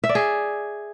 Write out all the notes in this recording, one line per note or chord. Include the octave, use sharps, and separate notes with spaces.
E5
D5
G#4